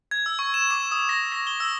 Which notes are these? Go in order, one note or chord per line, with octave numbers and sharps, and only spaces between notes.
G#6
E6
C#6
E7
D6
D#6
A#6
A#6
G7
E6